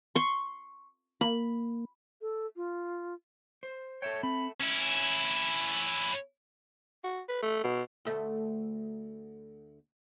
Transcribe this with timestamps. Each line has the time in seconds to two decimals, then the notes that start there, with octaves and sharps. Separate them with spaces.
0.15 C6 C#6
1.21 A#3 B5
2.21 A4
2.56 F4
3.63 C5
4.02 A4 C#5 E5 G5
4.23 C4 B5
4.60 C#4 E4
7.04 F#4
7.29 B4
7.42 A3
7.64 B2
8.05 D2 A3